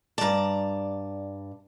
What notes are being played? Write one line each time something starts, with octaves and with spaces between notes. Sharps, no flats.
G2 D5 A5 A#5